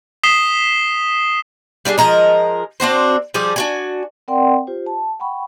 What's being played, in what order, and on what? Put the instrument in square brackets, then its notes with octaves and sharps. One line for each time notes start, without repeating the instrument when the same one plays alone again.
[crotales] D#6 B6 C7 E7 G7
[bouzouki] G3 D4 F#4 G#4
F3 G#3 A#4 D#5
C4 D4 F#4 C5
F3 G3 G#4 D5
D4 F#4 G#5
[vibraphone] C4 A#4 D5 F#5 G5 C6
F4 G4 C5
A5
F#5 G5 B5 C#6